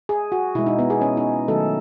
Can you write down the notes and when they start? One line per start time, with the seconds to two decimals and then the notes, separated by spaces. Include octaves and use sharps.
0.09 G#4
0.32 F#4
0.55 B2 G#3 E4
0.66 D#4
0.79 B3
0.90 G#4
1.02 C#4
1.17 D#4
1.48 D#3 F#3 A3 A4